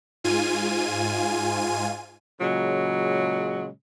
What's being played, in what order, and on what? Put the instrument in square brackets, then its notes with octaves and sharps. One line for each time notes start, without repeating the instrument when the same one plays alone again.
[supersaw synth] G#2 F4 G#5 D#7
[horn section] A#2 C#3 F#3 G#3